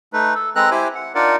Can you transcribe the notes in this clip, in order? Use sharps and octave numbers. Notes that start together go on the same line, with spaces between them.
A3 D#4 B4
A4
G#3 C4 A4 B4 A#5 F#6
E4 G4 C5 G#5
F#5
D4 D#4 F4 A#4 D5 F#5